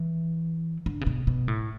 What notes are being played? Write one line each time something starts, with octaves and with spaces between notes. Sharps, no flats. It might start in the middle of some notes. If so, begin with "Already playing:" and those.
Already playing: E3
D3
C#3
B2
B2
A2